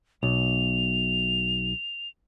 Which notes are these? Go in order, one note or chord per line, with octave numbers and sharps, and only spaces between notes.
B1 F7